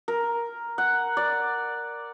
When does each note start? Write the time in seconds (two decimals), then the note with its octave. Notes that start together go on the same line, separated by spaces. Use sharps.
0.08 A#4
0.78 F#5
1.17 D5